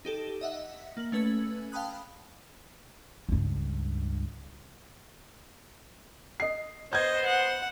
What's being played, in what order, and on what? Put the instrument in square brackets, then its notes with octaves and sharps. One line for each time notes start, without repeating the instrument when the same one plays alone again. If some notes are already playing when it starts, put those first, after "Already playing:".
[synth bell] D#4 G4 A4
D#5 E5 F#5
A#3 F#7
A3 C#4 B4 E6 G#6
F5 G5 A5 B5 D#6 F#6
[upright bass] C#2 G2
[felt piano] D#5 C7
[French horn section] B3 C5 [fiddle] D#5 [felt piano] G6 G#6
[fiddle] F#5